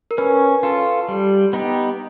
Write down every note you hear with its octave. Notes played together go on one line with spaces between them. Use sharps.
A#4
C#4 B4
F4 A4
G3
B3 D#4 G4